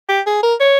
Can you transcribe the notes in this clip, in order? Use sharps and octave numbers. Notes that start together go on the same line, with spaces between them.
G4
G#4
A#4
C#5